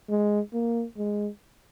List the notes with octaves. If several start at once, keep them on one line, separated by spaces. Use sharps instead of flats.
G#3
A#3
G#3